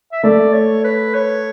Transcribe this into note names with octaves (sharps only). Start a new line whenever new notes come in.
E5
A3 D5
C#5
B4
C#5